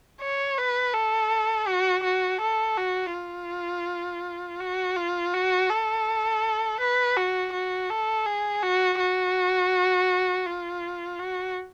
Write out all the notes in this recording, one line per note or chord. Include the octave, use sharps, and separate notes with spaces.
C#5
B4
A4
F#4
F#4
A4
F#4
F4
F#4
F4
F#4
A4
B4
F#4
F#4
A4
G#4
F#4
F#4
F4
F#4